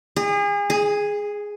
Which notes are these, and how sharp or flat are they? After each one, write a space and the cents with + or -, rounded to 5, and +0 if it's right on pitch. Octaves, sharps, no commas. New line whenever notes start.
G#4 -35
G#4 +0